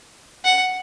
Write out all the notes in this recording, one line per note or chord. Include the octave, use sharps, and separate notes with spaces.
F#5